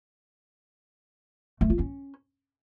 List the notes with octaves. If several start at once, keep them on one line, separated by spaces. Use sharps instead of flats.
A3
F4
C#4